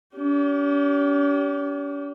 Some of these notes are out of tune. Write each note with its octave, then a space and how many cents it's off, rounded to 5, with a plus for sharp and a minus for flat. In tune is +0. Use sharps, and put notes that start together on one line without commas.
C#4 +45 G4 -20